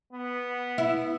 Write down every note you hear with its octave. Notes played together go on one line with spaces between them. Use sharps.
B3
E4